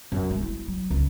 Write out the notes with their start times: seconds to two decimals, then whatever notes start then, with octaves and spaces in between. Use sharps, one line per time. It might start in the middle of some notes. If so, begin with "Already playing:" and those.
0.12 F#2
0.31 G#3
0.42 E4
0.68 F#3
0.90 C#2